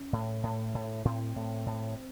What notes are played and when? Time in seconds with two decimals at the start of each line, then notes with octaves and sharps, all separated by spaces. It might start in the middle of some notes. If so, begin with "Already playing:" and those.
Already playing: C#4
0.13 A2
0.43 A2
0.75 A2
1.05 A2 C4
1.36 A2
1.66 A2